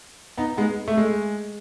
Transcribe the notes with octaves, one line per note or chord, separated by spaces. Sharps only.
B3 D#4
G#3 B3
A3
G#3